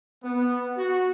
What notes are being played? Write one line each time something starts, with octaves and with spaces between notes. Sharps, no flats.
B3
F#4